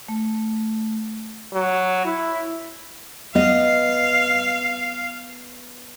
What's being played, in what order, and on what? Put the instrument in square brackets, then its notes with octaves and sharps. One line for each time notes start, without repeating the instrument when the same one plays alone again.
[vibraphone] A3
[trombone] F#3
E4
[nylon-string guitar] B3 D#5 [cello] F5